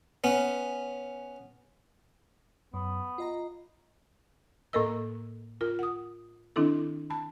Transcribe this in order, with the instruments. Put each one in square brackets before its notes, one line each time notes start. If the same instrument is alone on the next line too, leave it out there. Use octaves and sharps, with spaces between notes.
[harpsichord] B3 C#4
[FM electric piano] F#2 [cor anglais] B3
[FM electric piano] F4 D#5 A#5
[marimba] A2 A#3 A4 A#4 D#5 E6
F4 A#4
F#5 D#6
D#3 C4 D4 E4 A4
A5 B5